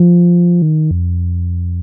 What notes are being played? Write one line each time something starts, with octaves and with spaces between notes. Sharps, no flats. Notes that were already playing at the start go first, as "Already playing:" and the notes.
Already playing: F3
D#3
F2